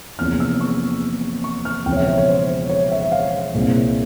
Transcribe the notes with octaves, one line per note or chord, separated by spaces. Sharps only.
E2 C3 F3 A#3 C#4 F6
E6
C#6
C#6
F6
E1 E2 C#3 F3 C4 G5
C#5
E5
C#5
C#5
C5
C#5
E5
F5
C2 A#2 G#3 C4